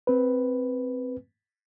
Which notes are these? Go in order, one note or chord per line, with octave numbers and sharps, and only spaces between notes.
C4 B4